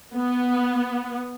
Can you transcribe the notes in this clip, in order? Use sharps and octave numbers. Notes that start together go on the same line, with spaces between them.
B3